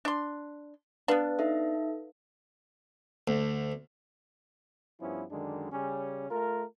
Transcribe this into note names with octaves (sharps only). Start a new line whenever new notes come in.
D4 C6
B3 D4 B4 F5
D#4 A4 E5
D2
G2 F3 B3 C#4 E4
F#2 D3 D#3 G#3 D4
C#3 G3 C#4
A3 F4 A#4